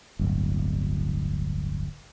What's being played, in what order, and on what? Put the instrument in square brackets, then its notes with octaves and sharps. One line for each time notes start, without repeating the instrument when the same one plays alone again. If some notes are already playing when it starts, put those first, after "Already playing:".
[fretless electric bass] D1 G1